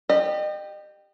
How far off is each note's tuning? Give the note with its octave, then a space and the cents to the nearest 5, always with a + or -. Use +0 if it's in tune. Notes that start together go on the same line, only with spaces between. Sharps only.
G4 +0 D#5 -40